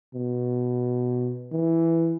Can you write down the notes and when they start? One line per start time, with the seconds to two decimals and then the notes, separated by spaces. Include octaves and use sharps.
0.15 B2
1.52 E3